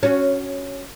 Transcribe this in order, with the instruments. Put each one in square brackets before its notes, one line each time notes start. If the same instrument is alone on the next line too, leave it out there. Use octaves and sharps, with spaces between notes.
[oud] C#4 F#4